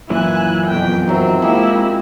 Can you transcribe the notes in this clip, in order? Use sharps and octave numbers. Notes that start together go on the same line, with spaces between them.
F#2 A#2 E3 E4 G#5 F#6
F2 B2 G5
D#3 F#3 C4 E5
F3 G#3 A#3 C4 E4 G4